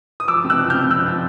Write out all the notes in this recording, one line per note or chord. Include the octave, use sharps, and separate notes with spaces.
D#6
F3 D6 E6
C3
E6 F#6
F3
C3 F6 G6
F3 E6 F#6
F3